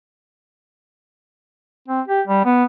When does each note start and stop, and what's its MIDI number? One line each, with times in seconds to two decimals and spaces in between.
1.88 2.01 60
2.08 2.21 67
2.27 2.41 55
2.45 2.64 59